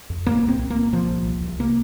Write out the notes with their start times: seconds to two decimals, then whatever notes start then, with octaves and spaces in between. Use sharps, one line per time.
0.10 F2
0.26 A#2 A#3
0.43 C2
0.48 C4
0.59 C2
0.70 A#3
0.76 A#2
0.93 A#2 F3
1.09 C2
1.26 C2
1.43 C2
1.59 C3 A#3